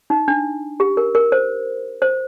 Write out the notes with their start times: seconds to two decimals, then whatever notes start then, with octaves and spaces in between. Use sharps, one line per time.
0.10 D#4
0.28 D4
0.80 G4
0.97 A#4
1.15 A#4
1.32 C5
2.02 C5